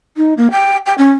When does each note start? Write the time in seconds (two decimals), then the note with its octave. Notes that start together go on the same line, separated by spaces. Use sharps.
0.17 D#4
0.37 A#3
0.51 G5
0.86 G5
0.98 C#4